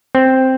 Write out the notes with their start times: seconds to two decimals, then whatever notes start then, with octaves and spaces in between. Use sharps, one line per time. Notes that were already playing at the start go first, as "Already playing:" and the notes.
0.15 C4